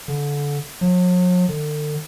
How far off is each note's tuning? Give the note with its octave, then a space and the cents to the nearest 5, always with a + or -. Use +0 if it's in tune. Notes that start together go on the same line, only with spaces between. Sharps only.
D3 -25
F#3 -45
D3 +35